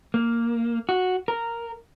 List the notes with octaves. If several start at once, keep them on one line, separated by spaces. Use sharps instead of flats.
A#3
F#4
A#4